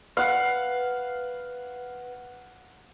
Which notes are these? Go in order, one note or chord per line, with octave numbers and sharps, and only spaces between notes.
B4 F5 F#5